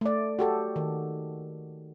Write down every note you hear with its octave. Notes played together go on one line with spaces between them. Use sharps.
A3 D5
F#4 G4 A4
D#3